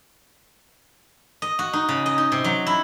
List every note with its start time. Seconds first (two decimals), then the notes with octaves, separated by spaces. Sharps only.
1.42 D#5
1.59 F#4
1.73 D#4
1.89 C#3
2.06 D#5
2.18 D#4
2.32 C3
2.44 F#3
2.67 E4